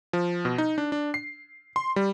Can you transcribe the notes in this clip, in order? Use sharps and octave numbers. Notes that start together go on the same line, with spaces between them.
F3
B2
D#4
D4
D4
C7
C6
G3